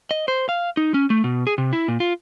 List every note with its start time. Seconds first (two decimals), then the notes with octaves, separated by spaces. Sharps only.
0.11 D#5
0.28 C5
0.49 F5
0.77 D#4
0.94 C#4
1.10 A3
1.24 B2
1.47 G#4
1.58 C3
1.73 E4
1.88 A#2
2.00 F4